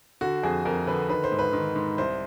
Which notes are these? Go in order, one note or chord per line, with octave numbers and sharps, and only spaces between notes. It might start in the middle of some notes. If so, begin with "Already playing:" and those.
D3 F#4
F2 G#4
F2 A#4
D3 B4
D#3 B4
C5
G#2
B4
D#3
G#2
C2 C5